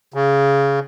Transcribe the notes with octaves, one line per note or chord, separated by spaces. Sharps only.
C#3